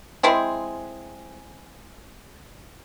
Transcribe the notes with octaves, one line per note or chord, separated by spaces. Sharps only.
G#3 C4 E4 G#4